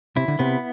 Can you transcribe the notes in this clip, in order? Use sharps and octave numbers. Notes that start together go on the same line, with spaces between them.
C3 E4
D3
C3 B3